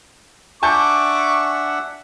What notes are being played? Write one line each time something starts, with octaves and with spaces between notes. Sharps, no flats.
D4 E5 F#5 G#5 A5 C#6 D6 G6